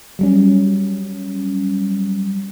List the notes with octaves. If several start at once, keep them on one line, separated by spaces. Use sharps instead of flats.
F#3 G3 C#4